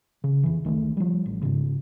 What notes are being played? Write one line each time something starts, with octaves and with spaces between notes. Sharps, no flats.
C#3
F2 E3
C#2 D#3 G#3 A3
F3 G3
A1
G#2 C#3